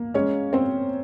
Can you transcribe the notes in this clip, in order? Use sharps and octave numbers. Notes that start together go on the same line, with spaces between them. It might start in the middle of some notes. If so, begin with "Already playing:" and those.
Already playing: A#3
G#3 C#4 C#5
C4 C5